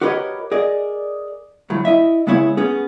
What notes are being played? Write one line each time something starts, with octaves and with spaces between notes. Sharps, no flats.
F#4 G4 A#4 B4 C#5 D#5
G#4 A#4 D5 D#5
D2 A2 F#3
E4 D#5 E5
C#3 G#3 B3 E4 B4 C#5
B3 C#4 G#4